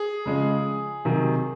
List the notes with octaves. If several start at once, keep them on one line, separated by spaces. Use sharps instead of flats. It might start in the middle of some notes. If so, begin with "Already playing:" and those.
Already playing: G#4
C#3 F3 G#3
C3 D#3 F#3